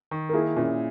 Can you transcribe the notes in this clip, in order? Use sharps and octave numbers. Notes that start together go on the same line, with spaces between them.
D#3
A#4
A#3 E4 G#4
A#2 C#4 E4